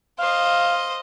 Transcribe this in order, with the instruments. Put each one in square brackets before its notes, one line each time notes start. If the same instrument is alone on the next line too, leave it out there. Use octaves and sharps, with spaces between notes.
[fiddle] C5 D#5 [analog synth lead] F5